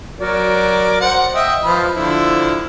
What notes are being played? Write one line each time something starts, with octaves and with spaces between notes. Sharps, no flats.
F#3 A#4 D5
C5 F#5
D#5 E5 G5
F3 B4 B5
D3 F3 E4